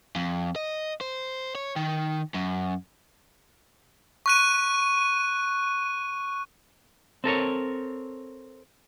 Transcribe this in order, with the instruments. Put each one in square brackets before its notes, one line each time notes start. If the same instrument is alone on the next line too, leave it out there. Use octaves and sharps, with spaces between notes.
[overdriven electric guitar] F2
D#5
C5
C#5
D#3
F#2
[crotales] C#6 F#6 D#7
[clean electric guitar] C4 A4 A#4 C#5